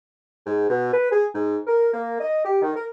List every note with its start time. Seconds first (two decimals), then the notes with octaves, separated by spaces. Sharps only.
0.46 G#2
0.69 B2
0.94 B4
1.12 G#4
1.35 G#2
1.67 A#4
1.94 A#3
2.21 D#5
2.45 G4
2.62 D#3
2.76 A#4